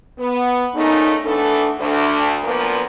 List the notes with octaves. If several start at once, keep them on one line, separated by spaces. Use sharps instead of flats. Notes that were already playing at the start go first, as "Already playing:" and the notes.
B3
A#2 C#3 A3 D#4
E3 A3 B3 D4 A4
D2
D2 A#2 F3 A#3 B3 B4